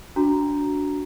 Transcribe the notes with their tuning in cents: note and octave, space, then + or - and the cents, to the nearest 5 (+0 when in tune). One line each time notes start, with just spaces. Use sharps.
D4 -15 F#4 +0 A#5 +0